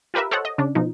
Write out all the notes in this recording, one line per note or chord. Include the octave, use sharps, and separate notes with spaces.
F4 G4 A#4 B4 E5
A4 C5 C#5 D#5 F#5
D#5
C#3 C#4 D4
B2 F3 D#4